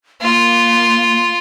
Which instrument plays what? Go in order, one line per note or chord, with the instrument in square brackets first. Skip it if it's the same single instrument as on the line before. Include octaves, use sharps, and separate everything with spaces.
[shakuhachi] A#3 [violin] F4